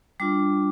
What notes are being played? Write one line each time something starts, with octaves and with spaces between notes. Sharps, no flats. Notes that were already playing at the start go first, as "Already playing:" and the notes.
G3 D4 F4 D6